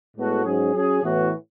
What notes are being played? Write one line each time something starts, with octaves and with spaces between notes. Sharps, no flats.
A2 G#3 B3 F#4 A4
G#2 F#3 C#4 G#4
F#3 C#4 G#4
A2 E3 B3 F#4